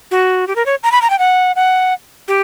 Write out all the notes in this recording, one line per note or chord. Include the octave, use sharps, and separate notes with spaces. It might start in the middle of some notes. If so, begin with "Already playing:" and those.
F#4
G4
A#4
C#5
A#5
B5
A#5
G5
F#5
F#5
G4